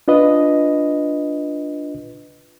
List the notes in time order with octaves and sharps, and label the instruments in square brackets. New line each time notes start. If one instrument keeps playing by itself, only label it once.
[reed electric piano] D4 F4 B4 D#5